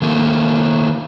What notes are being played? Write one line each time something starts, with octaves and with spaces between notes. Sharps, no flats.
D#3 A3 A#3